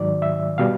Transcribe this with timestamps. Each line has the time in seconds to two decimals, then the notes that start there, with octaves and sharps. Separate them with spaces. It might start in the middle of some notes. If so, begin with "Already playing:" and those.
Already playing: G#2 D#3 F#3 D5
0.22 E5
0.58 B2 G3 F5